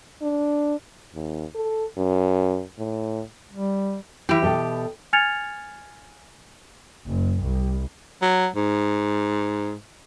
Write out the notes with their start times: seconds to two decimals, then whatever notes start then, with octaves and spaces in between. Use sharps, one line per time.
0.22 D4
1.14 D#2
1.55 A4
1.97 F#2
2.79 A2
3.53 G3
4.29 E3 E4 G4
4.43 B2 A4 G5
5.13 G#5 F6 G#6 A6 C#7 F7
7.07 F#1
7.42 C2
8.22 F#3
8.56 G#2